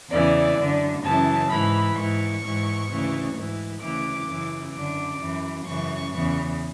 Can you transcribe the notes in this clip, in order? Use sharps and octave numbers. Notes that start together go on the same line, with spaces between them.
E2 C#3 E3 D5
F#2 D3
F#2 C#3 E3 A5
G#2 E3 B5
G#2 E3 C#6
G#2 E3
D2 C#3 E3
G#2 E3
D2 C#3 E3 D6
F#2 C#3 E3
F#2 D3 D6
F#2 E3
F#2 C#3 E3 C#6
E2 C#3 E3